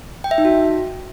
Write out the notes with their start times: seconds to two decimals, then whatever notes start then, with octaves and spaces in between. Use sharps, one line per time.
0.24 G5
0.31 E5
0.38 D#4
0.45 F#4